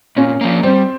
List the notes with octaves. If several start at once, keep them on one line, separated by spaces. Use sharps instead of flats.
A#2 C#4
F3 A#3
G3 C4